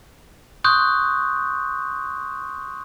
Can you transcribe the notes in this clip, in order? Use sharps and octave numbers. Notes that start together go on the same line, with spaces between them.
C6 C#6 D#6 F#6 G6